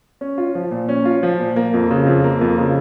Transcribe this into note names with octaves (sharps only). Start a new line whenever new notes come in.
C#4
F4
F3
A#2
C#4
F4
F3
A#2
A#3
F2
C#3
F2
A#3
F2
C#3